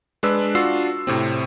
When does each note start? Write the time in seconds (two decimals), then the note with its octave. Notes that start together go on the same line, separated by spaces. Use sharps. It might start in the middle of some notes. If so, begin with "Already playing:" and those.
0.23 G#3 D4 B4 E6
0.55 D4 F4 F#4 E6 C7
1.07 A2 C3 C4